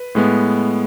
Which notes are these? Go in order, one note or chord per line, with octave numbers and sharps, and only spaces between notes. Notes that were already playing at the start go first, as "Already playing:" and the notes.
Already playing: B4
A2 G#3 B3